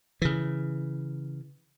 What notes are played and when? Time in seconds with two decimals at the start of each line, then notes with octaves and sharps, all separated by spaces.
0.22 C#3 E3